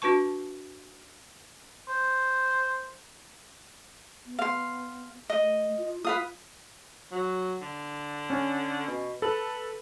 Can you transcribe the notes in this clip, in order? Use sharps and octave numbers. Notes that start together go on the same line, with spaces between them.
D4 F#4 B4 A5 C#6
C5
B3
F5 C6
A3 D#5
F4
F4 B4 F5 D#6
F#3
D3
C#4
B2
A4 B4